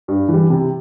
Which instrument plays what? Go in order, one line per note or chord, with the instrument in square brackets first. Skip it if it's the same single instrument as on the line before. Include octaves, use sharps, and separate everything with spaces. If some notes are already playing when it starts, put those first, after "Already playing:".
[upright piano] G2
E3 G3
C3